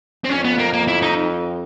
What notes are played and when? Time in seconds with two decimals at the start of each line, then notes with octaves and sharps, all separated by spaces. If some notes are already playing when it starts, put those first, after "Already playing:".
0.24 C4
0.29 F2 C#4
0.44 B3
0.58 A#3
0.73 A#3
0.88 E4
1.02 D#4